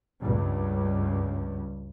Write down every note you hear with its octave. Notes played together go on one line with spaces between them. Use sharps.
C#2 G2